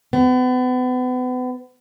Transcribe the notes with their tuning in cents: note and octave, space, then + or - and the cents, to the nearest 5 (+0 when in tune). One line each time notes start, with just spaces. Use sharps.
B3 +35